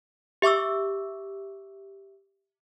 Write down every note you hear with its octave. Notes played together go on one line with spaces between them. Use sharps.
G4 E5 C#6 D6 E6